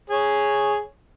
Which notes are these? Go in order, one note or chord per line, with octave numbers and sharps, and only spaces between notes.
G#4 C#5